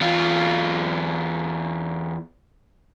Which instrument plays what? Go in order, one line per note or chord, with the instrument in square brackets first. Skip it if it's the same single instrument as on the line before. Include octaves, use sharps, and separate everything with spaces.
[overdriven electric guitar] E2 F4